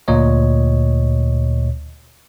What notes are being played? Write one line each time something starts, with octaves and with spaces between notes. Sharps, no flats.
D2 A#2 C#5 D#5